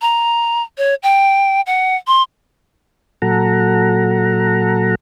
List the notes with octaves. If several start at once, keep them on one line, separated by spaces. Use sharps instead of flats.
A#5
C#5
G5
F#5
C6
A#2 F#3 A4 F#5 A#5